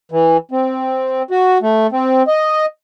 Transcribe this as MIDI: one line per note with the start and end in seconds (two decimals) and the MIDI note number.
0.12 0.37 52
0.51 1.23 60
1.31 1.58 66
1.62 1.87 57
1.92 2.23 60
2.27 2.66 75